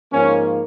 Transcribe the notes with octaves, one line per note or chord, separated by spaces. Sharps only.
G#2 F3 A#3 C#4